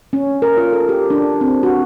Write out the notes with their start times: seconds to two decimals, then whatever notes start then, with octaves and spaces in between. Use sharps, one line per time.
0.13 C#4
0.42 A#4
0.57 F4
0.73 A4
0.89 G4
1.10 D4
1.41 C4
1.63 F#4